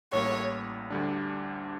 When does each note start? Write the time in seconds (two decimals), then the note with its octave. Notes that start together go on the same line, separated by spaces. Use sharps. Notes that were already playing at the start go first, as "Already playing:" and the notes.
0.13 A1 A2 G3 A#3 C#5
0.90 D2 D3 G3 D4